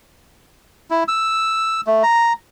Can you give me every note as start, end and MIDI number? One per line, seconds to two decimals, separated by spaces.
0.90 1.04 64
1.08 1.81 88
1.87 2.03 57
2.03 2.33 82